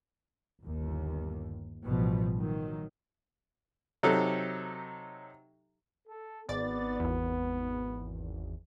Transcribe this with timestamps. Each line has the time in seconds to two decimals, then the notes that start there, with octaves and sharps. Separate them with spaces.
0.61 G1 D#2
1.86 A1 B2 F3 G3
2.39 D#3 F#3
4.03 C3 F#3 D#4 G4 A4
6.08 A4
6.49 G#1 B3 D5 A6
7.00 G#1 E2